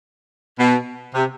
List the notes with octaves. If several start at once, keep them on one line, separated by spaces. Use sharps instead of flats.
B2
C3